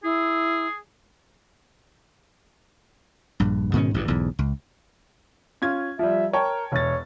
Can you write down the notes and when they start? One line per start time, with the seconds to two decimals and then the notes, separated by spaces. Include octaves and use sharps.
0.04 E4 G#4
3.40 A#1 G2
3.73 G#2 B2 D#3 C#4
3.94 A1 D2 G2
4.08 B1 E2 G#2
4.39 C#2
5.62 C#4 F4 G#6
5.99 F3 G3 E5
6.33 A#4 C#5 G5 A5
6.72 E1 C#5 A6